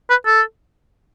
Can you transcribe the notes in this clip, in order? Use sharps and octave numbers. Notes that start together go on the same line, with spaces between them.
B4
A4